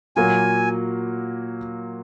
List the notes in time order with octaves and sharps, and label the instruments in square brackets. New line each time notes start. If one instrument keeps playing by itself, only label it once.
[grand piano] A#2 F#3 A#3 [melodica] G#5